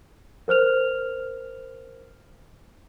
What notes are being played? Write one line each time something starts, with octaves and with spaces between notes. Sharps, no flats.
A#4 C5 F6 F7